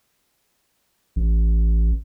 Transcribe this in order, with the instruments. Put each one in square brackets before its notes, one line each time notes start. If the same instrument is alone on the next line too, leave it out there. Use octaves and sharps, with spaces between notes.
[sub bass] A1